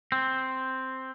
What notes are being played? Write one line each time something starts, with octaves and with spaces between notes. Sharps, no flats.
C4